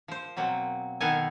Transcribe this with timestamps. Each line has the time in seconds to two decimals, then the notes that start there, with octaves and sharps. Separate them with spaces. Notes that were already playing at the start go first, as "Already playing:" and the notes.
0.08 F3 C5
0.37 B2 F#3 A#3 C4
1.01 B2 D#3 B3 A4 A#4 G#5